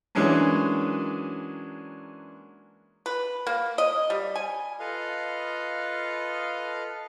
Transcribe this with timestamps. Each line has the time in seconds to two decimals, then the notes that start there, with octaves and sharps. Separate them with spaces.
0.15 E3 F#3 G#3 A#3 C#4 D4
3.06 B4
3.47 A#3
3.78 D#5
4.10 G3
4.36 G#5
4.80 F4 A4 B4 D#5 F5